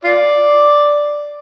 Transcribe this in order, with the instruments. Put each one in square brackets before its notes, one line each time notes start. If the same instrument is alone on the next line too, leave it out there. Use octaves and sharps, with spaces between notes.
[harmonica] F4 D5